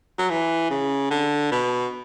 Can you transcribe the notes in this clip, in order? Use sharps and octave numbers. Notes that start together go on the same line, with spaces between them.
F#3
E3
C#3
D3
B2